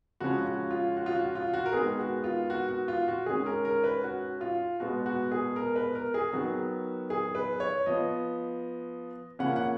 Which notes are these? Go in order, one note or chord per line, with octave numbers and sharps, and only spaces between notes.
C#3 F3 G#3 C#4 F#4
F#4
F4
F#4
F4
F#4
F4
F#4
A#4
D#3 G#3 B3 G#4
F#4
F4
F#4
F#4
F4
F#4
D#3 G#3 C#4 G#4
A#4
A#4
B4
F#4
F4
B2 G#3 B3 F#4
F#4
G#4
A#4
B4
A#4
G#4
D#3 F#3 B3 F#4
G#4
B4
C#5
F3 B3 D#5
C#3 F3 A#3 C#4 F#5
F#5